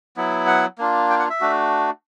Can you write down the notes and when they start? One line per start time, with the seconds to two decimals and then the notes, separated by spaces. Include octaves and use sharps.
0.17 F#3 B3 E4
0.47 F#5
0.79 A#3 D4 F4
1.10 G5
1.19 F#5
1.30 E5
1.41 A3 D4 F#4